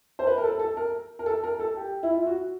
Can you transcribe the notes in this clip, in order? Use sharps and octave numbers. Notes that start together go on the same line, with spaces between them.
C5
B4
A#4
A4
A4
A#4
A#4
A4
A#4
A4
G4
E4
F4
F#4